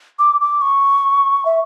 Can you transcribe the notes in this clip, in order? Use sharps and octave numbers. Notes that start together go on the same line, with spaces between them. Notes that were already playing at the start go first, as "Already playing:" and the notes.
D6
D6
C#6
E5